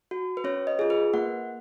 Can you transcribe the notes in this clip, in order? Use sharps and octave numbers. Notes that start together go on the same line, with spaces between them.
F#4
B4
C#4 C#5
D#5
F4 G#4
B4
A#3 F#5